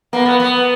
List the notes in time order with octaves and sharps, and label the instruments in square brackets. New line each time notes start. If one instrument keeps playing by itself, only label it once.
[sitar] A#3 [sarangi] B3
[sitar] B3
B3